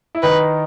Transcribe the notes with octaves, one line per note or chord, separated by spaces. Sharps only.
E4
D#3 D#4 B4